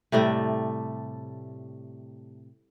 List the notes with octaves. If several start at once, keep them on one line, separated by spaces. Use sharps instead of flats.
A2 C3 G3 A3